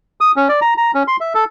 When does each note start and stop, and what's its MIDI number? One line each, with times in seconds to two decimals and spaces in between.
0.21 0.32 87
0.36 0.48 61
0.49 0.60 74
0.61 0.74 82
0.77 0.91 82
0.95 1.03 61
1.08 1.16 84
1.20 1.33 76
1.35 1.44 69